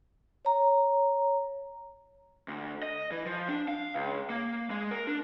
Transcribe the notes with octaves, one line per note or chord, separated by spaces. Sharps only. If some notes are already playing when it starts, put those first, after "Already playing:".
C#5 A#5
D2
D#5
E3
F3
D4
F5
C#2
A#3
G#3
A#4
D4